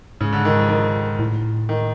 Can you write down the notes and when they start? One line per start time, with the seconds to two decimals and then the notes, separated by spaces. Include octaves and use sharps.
0.21 G#2 C#3
0.33 D3
0.45 D#3
0.58 F3
0.69 D#3
1.19 A2
1.69 D#3